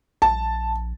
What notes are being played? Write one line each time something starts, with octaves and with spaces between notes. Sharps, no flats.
A#1 A5